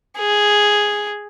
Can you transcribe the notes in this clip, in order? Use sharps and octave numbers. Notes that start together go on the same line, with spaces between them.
G#4